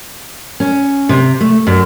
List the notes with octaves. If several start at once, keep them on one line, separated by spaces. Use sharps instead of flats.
C#4
C3
A3
F#2